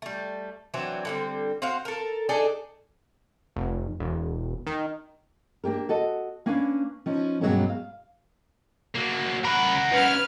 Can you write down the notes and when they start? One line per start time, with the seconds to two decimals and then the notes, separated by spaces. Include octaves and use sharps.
0.02 G3 A3
0.74 E3 F#3 C4 D4
1.05 D3 G3 C4
1.62 C4 F#4 C5 F5
1.85 A4 A#4
2.29 D4 D#4 G#4 A4
3.56 F1
4.00 E1
4.67 D#3
5.64 A#3 D4 G4 A#4
5.89 F#4 A4 D#5
6.46 A#3 C#4 D4 B4 F5
7.06 F3 C#4 D#4
7.41 G2 B2 F#3 G#3 A#3 C#4
7.70 F5
8.95 F#3 A#3
9.45 C#2 A#4 F#5 B5
9.92 D#3 C#4 B4 F6